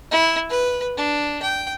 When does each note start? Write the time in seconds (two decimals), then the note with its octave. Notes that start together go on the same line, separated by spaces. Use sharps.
0.11 E4
0.50 B4
0.97 D4
1.42 G5